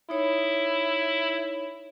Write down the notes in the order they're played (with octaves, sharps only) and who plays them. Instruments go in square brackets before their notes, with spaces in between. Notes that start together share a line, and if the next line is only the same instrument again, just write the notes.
[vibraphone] D#4 C#5 [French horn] E4